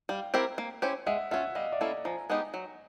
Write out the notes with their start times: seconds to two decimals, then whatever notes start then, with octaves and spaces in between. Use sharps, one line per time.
0.09 G3 F5 G5
0.34 C4 E4 G4 A#4
0.58 A#3
0.82 C#4 E4 G4 C5
1.06 G#3 E5 F#5
1.31 C#4 F4 E5 F#5
1.55 G3 D#5 F5
1.72 D5 E5
1.81 A#3 C#4 E4 A4
2.05 F3 G#5 A#5
2.30 G#3 B3 D#4 G4
2.54 F#3